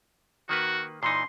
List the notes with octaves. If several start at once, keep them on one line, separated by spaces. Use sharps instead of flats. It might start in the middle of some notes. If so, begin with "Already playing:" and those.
D#3 A#3 F#4 B4
A#2 E3 D#4 C6